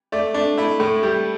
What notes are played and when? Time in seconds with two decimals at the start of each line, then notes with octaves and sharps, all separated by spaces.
0.12 A3 D5
0.34 A3 D4
0.57 A3 E4
0.80 A2
1.03 G3